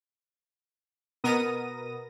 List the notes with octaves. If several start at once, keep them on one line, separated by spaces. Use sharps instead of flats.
B2 B3 A#4 D#6 A#6 D#7